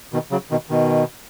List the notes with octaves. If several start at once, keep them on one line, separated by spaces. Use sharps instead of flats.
B2 D#3
C#3 F#3
B2 D#3
B2 D#3